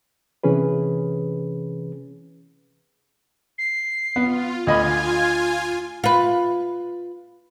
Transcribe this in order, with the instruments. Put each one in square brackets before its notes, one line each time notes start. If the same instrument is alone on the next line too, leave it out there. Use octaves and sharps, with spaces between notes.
[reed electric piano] C3 E3 C#4 G#4 B4
[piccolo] C7
[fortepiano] B3 [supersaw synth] F4
[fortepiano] D2 D#5 B5 [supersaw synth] F4 G#5 [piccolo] G#6
[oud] F4 B4